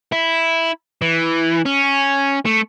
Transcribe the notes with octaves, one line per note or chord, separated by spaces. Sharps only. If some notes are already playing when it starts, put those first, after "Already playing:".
E4
E3
C#4
A3